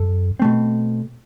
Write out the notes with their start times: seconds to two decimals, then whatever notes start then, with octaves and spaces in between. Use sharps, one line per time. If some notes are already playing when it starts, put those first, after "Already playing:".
Already playing: F#2 A4
0.39 B2 A3 C4